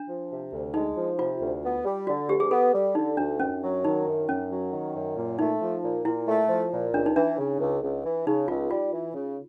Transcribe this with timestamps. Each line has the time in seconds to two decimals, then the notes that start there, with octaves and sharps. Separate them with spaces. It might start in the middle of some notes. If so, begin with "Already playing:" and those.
Already playing: D4
0.09 F3
0.31 C3
0.52 D2
0.74 G#3 D#4
0.97 F3
1.19 C3 F4
1.41 D2
1.63 B3
1.85 G3
2.07 D3 F#4
2.29 D2 G4
2.40 G#4
2.51 B3 A4
2.74 G3
2.95 D3 D#4
3.17 D2 D4
3.40 F#2 C#4
3.62 F#3
3.84 D#3 D#4
4.06 F#2
4.29 F#2 C#4
4.50 F#3
4.72 D#3
4.94 F#2
5.17 A#2
5.39 A3 D#4
5.61 F3
5.83 A#2
6.05 A#2 E4
6.27 A3
6.49 F3
6.72 A#2
6.94 C#2 D4
7.06 D#4
7.15 E3 D4
7.38 C#3
7.59 C#2
7.82 C#2
8.05 E3
8.27 C#3 D#4
8.48 C#2 F4
8.70 G3 F4
8.92 E3
9.14 C#3